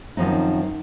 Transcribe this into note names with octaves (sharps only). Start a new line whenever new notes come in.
F#2 D#3 F3 C4 D#4